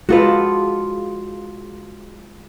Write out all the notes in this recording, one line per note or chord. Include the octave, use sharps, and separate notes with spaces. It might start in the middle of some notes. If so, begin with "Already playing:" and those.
G#3 F4 F#4 A4 B4